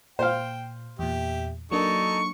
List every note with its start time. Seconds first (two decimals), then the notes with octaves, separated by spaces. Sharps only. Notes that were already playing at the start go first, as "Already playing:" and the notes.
0.19 A#2 C5 F5 G5
0.99 E2 A#2 G4 E5
1.72 F#3 A#3 D4 D#4 A4 C#6